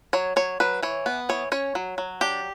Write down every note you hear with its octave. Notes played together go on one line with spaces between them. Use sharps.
F#3 C#5
F#3 C#5
F#3 B4
E3 C#5
B3
E3 C#5
C#4 C#5
F#3
F#3
D4 G4